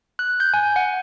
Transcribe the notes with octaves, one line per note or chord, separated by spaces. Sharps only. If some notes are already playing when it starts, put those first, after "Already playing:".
F#6
G6
G#5
F#5